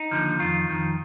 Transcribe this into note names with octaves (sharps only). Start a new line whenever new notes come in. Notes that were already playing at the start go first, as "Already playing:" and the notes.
Already playing: D#4
D#2 D3 F3
F2 D#3 F4
F2 D#3